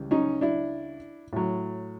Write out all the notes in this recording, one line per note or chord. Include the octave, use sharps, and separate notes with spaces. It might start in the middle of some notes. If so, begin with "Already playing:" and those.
Already playing: C#2 E3 G3
C#4 D#4
D4 E4
A2 F#3